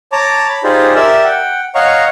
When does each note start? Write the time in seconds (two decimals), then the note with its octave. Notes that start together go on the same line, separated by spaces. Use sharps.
0.12 C#5 A5 A#5 D6
0.49 B5
0.63 D#4 F4 G4 G#4 C5 D5
0.96 G4 A#4 D5 E5 E6
1.24 F#5 G5
1.75 C#5 D#5 F5 F#5 A#5 C#6